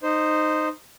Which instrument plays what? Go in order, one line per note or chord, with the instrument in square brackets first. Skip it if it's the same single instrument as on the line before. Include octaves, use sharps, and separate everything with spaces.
[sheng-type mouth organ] D#4 C5